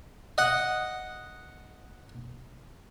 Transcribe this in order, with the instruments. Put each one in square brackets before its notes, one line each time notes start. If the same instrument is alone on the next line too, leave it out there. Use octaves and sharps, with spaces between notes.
[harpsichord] D#5 F#5